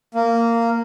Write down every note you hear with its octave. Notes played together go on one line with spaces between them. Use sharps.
A#3